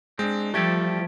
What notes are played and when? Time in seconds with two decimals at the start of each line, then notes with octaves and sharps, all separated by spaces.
0.19 G#3 C4 D4
0.54 F3 G3 A3 G4 A4 G#6